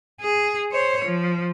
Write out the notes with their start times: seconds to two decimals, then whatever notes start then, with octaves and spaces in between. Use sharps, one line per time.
0.21 G#4
0.72 C5 C#5
1.05 F3